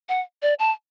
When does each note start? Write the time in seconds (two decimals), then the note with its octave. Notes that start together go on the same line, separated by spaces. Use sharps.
0.09 F#5
0.42 D5
0.59 A5